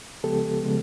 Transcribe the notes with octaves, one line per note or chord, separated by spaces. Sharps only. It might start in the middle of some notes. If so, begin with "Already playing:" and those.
C#2 C#3 F3 G#3 B3 G4 A4
C#3 F3 G#3 B3